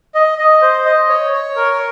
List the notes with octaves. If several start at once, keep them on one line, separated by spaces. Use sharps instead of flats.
D#5
D#5
C5
D#5
C#5
C#5
A#4